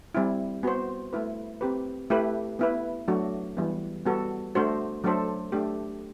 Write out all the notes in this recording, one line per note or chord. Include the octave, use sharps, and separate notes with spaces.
G3 C4 E4
B3 F#4 C5
A3 E4 B4
C4 G4 B4
A3 E4 G4 B4
B3 E4 B4
F#3 A3 D4 F#4
E3 G3 B3
G3 B3 F#4 A4
A3 D4 F#4 C5
F#3 A3 D4 A4 C5
A3 D4 G4